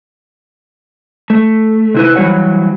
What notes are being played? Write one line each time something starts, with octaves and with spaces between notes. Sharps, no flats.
A3
C3 E4 B4
E3 F#3 G3 B4 C#5 F#5